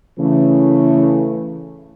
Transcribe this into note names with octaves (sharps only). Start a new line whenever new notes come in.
C#3 E3 A3